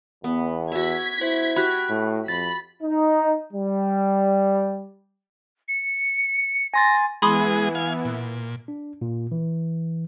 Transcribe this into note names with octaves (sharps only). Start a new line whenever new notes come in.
E2 B3
F#4 E5 G#6 B6
E4 C5
F#4 G4 B5 F#6
A2
F2 B5 A6
D#4
G3
C#7
G#5 C6 A6 A#6
E3 G#3 B3 E4 G#4 B5 C6 D#6
F5 G#5
A#2
D4
A#2
E3